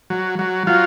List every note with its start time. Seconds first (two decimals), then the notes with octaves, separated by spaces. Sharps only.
0.10 F#3
0.39 F#3
0.67 F#3 F4